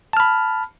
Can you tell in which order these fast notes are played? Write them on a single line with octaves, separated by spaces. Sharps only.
A5 F6 B5